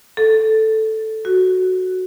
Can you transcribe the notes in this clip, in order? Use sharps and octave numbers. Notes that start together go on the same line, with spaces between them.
A4
F#4